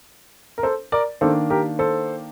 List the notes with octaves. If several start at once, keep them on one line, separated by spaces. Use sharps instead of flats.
A#4
A4 C5
A#4 D5
D#3 A#3 D4 A4 C5
G4 A#4
A4 C5